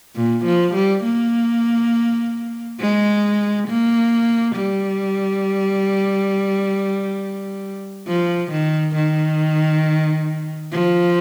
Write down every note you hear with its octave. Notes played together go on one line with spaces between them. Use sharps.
A#2
F3
G3
A#3
G#3
A#3
G3
F3
D#3
D#3
F3